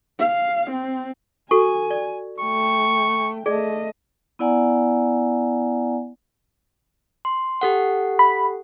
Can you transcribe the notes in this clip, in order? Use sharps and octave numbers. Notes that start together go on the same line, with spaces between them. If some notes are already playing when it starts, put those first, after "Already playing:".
F5
C4
F#4 A4 G#5 C#6
D5
A3 G5 C#6
A3 G#4 D5 D#5
B3 E4 D5 F#5 G#5 A#5
C6
G4 A4 F#5
B5